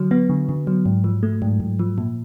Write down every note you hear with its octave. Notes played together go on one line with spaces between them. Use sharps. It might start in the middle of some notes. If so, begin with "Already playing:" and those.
Already playing: D3 F#3
B3
D3
D3
F#3
G#2
F3
A3
G#2
G#2
F3
A#2